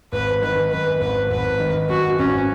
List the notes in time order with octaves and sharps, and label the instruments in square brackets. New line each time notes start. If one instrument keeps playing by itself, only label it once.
[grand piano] G#1 [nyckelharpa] B4
[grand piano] D#3 [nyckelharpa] B4
[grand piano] F#2 [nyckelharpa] B4
[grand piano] G#1 [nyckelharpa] B4
[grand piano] G#1 [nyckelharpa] B4
[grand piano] D#3
[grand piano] F#2 [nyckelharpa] F#4
[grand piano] G#1 [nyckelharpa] C#4